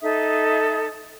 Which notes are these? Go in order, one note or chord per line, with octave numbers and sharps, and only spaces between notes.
D#4 A4 E5 D#6